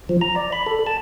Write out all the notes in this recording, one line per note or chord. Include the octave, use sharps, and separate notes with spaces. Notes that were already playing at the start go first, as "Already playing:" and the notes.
F3
A#5
D5
B5
A4
A5